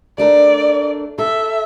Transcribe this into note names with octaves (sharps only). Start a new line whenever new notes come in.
A3 D4 A#4 D5
A4 E5